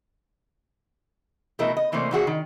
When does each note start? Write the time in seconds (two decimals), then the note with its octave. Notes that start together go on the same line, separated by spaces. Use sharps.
1.59 B2 E3 A3 E4 A#4 D#5
1.77 D#5
1.92 C3 E3 A3 A#3 C5 D5
2.11 A#2 E3 F#4 G#4
2.27 D#3